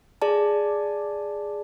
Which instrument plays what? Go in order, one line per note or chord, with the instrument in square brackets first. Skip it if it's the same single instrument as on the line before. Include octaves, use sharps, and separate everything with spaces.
[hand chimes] G#4 D5 A5